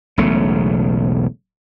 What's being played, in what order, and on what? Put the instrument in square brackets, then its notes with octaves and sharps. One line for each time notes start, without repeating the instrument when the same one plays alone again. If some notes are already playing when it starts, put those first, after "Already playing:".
[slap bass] E1 B1 C#3 A3